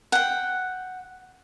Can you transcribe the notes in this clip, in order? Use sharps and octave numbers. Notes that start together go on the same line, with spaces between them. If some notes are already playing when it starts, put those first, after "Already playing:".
F#5 G5